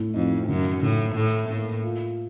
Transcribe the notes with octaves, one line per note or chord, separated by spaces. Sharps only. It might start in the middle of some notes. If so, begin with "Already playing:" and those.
Already playing: A2 A3
F2 D#4
F#2 D#3
A2 D#3
A2 A4
A2 A#3
F4